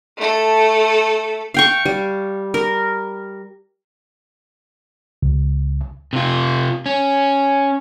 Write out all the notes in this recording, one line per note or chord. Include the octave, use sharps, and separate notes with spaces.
A3 A4
F5 G5 C#6
G3
A#4
C#2
C3 F4
C#4